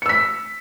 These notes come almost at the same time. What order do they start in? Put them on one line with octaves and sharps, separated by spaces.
C#7 E6 B6